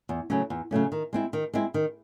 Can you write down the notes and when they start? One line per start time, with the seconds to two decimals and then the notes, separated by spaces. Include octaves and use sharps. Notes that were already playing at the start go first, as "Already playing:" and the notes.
0.09 E2
0.30 C#3 F#3 A3 C#4
0.50 E2
0.71 C#3 F#3 A3 C#4
0.92 D#3
1.13 G#3 C4 E4
1.33 D#3
1.54 G#3 C4 E4
1.74 D#3